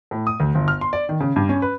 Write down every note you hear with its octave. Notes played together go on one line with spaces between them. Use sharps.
A2
D#6
D2
G1
F6
C6
D5
D#3
C#3
G2
C#4
B4